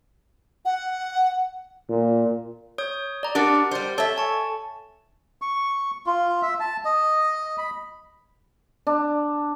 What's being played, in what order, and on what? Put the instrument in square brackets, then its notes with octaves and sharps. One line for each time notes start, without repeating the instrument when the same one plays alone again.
[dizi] F#5
[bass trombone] A#2
[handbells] C#5 D#6 G6
D5 A#5
[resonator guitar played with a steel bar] D4 F#4 [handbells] G4 A#4 F#5
[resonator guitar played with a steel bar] G3 C5
[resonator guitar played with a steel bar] A4 E5 [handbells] C#5
[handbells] G#5 A5 C#6
[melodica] C#6
F4
E5
A5
D#5
B5
[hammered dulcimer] D4